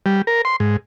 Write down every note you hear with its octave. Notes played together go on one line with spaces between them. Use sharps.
G3
A#4
C6
G#2